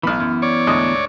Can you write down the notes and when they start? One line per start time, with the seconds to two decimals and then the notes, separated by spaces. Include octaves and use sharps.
0.03 B1 E3 B3 B5 F6
0.20 F#2
0.42 C#5 D5
0.67 D2 G#2 D#5